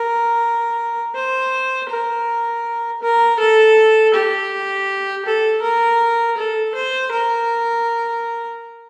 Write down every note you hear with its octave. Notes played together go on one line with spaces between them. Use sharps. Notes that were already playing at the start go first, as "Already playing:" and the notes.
Already playing: A#4
C5
A#4
A#4
A4
G4
A4
A#4
A4
C5
A#4